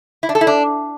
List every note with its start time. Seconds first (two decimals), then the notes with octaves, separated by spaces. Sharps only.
0.23 E4
0.29 D4
0.35 A4
0.41 E4
0.47 D4